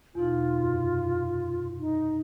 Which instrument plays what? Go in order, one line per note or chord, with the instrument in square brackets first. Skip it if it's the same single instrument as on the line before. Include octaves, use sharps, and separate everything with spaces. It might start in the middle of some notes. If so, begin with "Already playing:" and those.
[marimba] E2 B2 D#4 [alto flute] F4
[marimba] F#2 C3
[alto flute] D#4